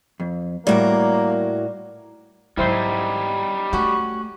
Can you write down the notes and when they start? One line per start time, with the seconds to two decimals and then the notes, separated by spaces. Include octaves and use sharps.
0.20 F2
0.67 A2 G3 A#3 F#4 A#4 D5
2.57 G#2 F#3 G3 D#4 E4 C5 C6
3.73 A3 C#4 F#4